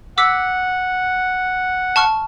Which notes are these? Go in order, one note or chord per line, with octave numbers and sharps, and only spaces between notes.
F#5 D6 E6 B6
A5 C#6 F6